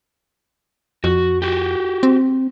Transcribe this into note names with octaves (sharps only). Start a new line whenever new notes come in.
F2 F#4
F#4 G4
C4